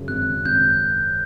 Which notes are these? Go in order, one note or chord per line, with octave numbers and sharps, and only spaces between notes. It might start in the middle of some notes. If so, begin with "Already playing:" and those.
Already playing: F#2 C#3
G#1 F#6
C#3
G#1 G6